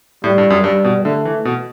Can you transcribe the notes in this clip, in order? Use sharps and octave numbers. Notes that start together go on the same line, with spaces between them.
A2 G3
G2
F#2
G2 G3
B2
D3 A3
E3
B2